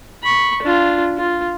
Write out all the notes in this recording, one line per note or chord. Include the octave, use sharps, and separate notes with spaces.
B5 C#6
D4 F4
F4